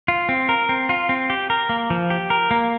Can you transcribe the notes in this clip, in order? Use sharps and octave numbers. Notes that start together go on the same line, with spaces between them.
F4
C4
A#4
C4
F4
C4
G4
A#4
A#3
F3
G4
A#4
A#3